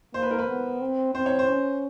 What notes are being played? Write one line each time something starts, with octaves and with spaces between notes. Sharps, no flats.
A#3 C5
B4
A#4
B4
B3
C4
C4 C5
C#5
C5
C#4